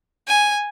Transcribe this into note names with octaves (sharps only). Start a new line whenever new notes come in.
G#5